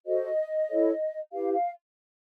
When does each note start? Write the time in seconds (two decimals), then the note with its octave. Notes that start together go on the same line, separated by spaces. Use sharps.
0.06 F#4 A4 C5 D#5
0.69 E4 A4 C#5
1.32 E4 G4 B4 F5
1.53 F5